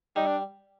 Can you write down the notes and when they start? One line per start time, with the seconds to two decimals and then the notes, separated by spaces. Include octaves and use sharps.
0.16 G3 D#4
0.27 D4